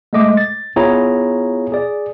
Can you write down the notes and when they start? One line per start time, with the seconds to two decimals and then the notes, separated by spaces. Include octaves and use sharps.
0.13 G#3 A3 D#5 D6
0.37 A6
0.76 B3 E4 F4 G#4 C#5 A#5
1.72 G#4 D5